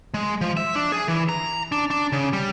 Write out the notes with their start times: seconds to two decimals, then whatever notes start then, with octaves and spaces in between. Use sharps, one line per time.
0.14 G#3
0.41 F3
0.57 E5
0.75 D4
0.92 G#4
1.08 E3
1.29 A#5
1.72 D4
1.90 D4
2.12 C#3
2.33 G3